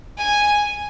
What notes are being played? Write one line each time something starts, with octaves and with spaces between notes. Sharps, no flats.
G#5